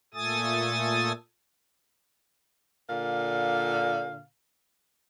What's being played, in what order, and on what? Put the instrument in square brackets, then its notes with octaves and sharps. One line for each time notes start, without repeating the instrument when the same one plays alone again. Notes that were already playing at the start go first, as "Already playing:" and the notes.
[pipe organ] A#2 A3 A4 G#5 D#6 A6
[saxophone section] A#2 D3 F5